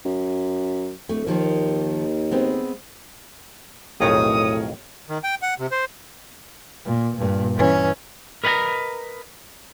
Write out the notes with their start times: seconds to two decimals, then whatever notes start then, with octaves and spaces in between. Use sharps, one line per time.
0.05 F#2
1.09 D1 A3
1.27 D#2 D#3 F3 A#3
2.31 G#3 B3 C4
4.00 B1 F2 A2 D#3 G#4 A#4 C#5 D#6
5.09 D#3
5.24 G5
5.42 F#5
5.59 C3
5.71 C5
6.85 A#2
7.16 G2 A#2
7.55 E3 C#4
8.44 A#4 B4 D#5 F#5 A#5